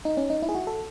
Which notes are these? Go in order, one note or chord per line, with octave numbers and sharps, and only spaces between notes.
D#4
C#4
D#4
E4
G#4
F#4
A4